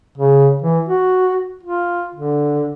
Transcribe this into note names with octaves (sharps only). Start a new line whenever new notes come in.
C#3
E3
F#4
F4
D3